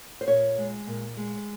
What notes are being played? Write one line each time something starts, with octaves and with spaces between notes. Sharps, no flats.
C5
A#2 C#5
G#3
A#2
G#3